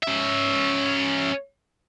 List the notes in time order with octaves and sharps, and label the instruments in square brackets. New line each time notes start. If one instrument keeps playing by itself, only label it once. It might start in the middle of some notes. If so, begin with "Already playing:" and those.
[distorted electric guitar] C#4 E5